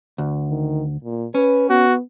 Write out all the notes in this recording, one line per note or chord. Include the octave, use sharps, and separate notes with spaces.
D2
D#3
A#2
C#4 B4
B3 F#4